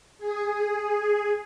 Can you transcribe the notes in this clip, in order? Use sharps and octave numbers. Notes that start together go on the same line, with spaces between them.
G#4